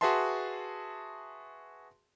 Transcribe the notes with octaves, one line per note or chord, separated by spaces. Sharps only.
F#4 G#4 B4 E5 A5 C6